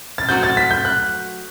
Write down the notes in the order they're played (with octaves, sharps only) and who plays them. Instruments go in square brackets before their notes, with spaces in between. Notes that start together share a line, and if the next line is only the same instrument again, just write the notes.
[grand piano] A6
[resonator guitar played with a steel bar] F#3 A3 D4 F#4 C5 [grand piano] G6
[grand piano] A6
B6
G6
F#6